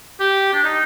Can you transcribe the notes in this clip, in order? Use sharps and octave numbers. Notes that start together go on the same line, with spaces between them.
G4
D4
D#4